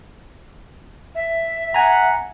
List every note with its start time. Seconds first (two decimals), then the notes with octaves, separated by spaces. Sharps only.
1.15 E5
1.74 F#5 G#5 A#5